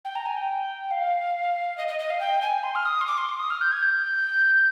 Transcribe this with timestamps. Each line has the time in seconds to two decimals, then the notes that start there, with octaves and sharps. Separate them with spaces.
0.05 G5
0.15 A#5
0.26 G#5
0.37 G5
0.91 F5
1.78 D#5
1.88 D#5
1.99 D#5
2.10 F5
2.20 G5
2.42 G#5
2.63 C6
2.75 F6
2.85 D#6
3.01 C6
3.07 D6
3.18 C6
3.29 D6
3.39 D#6
3.50 F6
3.61 G6
3.72 G#6
3.82 G6